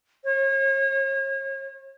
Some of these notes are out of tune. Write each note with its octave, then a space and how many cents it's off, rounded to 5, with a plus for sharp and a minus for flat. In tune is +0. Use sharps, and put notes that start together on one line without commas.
C#5 -35